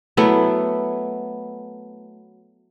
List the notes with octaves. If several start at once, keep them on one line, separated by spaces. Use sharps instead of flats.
F#3 A3 B3 E4